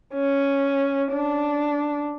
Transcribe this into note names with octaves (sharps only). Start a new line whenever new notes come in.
C#4
D4